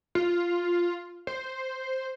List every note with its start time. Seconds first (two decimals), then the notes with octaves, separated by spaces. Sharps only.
0.15 F4
1.27 C5